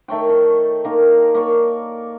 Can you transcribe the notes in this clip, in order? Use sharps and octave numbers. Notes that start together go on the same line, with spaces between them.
D#3 A3 C#5 G5
A4
D#3 A#3 A#4
A#3 C#5 D5